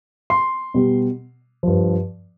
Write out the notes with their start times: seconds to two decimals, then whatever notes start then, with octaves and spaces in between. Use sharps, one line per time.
0.30 C6
0.74 B2 G3
1.63 G2 F3